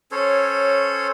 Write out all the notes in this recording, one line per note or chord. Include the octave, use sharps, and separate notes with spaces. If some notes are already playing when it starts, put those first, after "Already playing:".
C#4 A4 C5 C#5